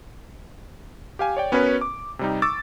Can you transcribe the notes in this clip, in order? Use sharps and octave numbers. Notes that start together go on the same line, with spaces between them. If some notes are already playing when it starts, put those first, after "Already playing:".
G4 F5 G#5
C#5 D5 G5
B3 C#4 F#4 A#4 B4 C#5
D6
C3 G3 D#4
C#6 D6 E6 A6